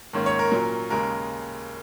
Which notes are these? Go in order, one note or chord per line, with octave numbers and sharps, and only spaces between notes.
G#2 D#3 A#3 C#4
C#5
A#4
A#2 F#3 C#4
D#2 C#3 G#3 A#4